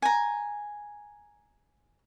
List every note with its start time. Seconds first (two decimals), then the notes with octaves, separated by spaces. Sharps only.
0.02 G#5 A#5